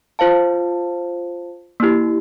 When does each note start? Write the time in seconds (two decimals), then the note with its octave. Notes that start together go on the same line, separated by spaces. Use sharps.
0.19 F4 C5 F5 A5
1.80 A#3 E4 G4